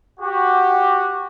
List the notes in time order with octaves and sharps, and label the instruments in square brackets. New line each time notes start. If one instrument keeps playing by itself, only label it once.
[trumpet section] F#4 G4